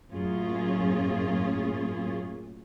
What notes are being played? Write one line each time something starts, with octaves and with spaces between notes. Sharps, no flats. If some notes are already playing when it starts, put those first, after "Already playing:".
F#2 A2 A#3 C#4 F4 G#4